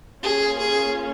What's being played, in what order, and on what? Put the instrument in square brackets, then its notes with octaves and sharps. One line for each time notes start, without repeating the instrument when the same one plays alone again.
[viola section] A#3 C#4 F4 [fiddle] G#4
[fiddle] G#4